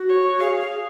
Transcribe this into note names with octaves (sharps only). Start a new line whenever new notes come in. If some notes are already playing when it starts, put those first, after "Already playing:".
Already playing: F#4
C#5
G#4 F5
G#4